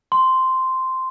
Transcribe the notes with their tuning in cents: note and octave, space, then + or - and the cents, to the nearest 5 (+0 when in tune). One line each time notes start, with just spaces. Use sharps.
C6 -5